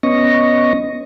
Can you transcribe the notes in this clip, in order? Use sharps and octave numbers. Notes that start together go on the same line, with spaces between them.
B3 C#4 D#5 C#6 A#6